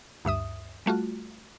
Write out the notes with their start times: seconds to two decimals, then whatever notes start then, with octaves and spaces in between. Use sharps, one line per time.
0.25 D2 G2 E5 D#6
0.86 G3 A3 F4 F#4